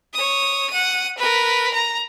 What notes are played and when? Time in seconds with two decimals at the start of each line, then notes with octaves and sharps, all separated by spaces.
0.14 C#5 D#6
0.70 F#5 D#7
1.18 A#4 B4
1.74 A#5